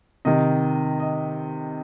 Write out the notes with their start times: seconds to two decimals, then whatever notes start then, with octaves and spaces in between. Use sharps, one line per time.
0.25 C3 D#3 D#5
1.00 D#5